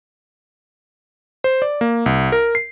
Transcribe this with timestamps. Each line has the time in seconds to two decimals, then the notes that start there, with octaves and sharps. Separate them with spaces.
1.44 C5
1.62 D5
1.81 A#3
2.06 C2
2.32 A#4
2.55 C7